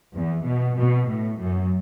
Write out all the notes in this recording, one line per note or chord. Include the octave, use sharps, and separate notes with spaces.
E2
B2
B2
A2
F#2